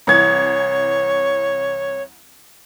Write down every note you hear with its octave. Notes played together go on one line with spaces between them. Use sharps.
C2 E3 C#5 G#6